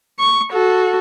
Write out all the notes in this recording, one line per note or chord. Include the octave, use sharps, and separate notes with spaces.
C#6
F#4 A4